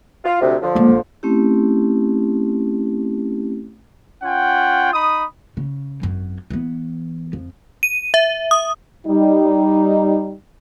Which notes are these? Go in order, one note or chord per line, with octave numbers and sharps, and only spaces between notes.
F4
D2 C3
D3 F3
G#3 A#3
G#1
A3 C4 C#4 E4 G4
C#4 F4 F#5 G5
D#4 B5 D#6
C#3
G#1 F#2
E3 B3
F2
D#7
E5
D#6
G3 D#4